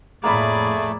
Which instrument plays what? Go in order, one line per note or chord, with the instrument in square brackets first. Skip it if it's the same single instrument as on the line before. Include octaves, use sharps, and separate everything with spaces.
[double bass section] F2 A2 [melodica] A3 [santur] A#3 E5 B5 [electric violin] G#4 D5